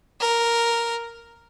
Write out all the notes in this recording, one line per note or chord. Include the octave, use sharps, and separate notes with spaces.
A#4